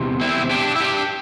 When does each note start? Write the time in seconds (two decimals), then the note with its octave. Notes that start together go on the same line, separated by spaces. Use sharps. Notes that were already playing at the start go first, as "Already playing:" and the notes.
Already playing: E2 C3
0.21 C4 E4
0.51 D4 G4
0.76 E4
0.81 D4 G4